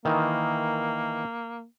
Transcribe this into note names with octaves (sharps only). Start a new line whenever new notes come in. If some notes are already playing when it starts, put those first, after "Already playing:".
D#3 E3 A#3 D#4